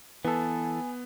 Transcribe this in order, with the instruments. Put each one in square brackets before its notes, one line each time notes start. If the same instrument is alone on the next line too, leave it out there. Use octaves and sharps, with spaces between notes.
[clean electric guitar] E3 A4 [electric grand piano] B3 [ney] G#5